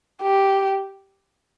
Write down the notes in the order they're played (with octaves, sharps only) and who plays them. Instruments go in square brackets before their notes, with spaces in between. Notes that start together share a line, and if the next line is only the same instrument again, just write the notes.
[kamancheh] G4